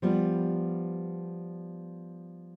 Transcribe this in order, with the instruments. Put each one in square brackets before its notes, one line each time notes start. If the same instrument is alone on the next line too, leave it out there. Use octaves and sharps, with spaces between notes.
[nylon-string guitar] F3 G3 B3